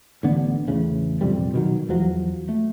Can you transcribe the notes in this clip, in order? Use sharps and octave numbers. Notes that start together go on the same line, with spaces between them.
A1 D3 B3
E2 A2 C#3
A#1 F2 C3 G3
B2 D#3 F#3
E2 F3 F#3
A3